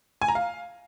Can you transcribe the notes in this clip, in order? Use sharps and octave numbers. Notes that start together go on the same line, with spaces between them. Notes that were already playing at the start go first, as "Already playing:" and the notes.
G#5
A#5
F5